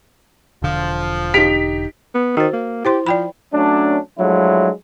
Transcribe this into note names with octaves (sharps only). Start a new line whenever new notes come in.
E1 D3 F3
D#4 G4 B6 D7 F7
B3
D#3 F#4 C5
A#3
E4 G4 C5 C6
F3 D5 G5 B5
F#3 A3 C#4 D4
F3 F#3 G#3 A3 D4 E4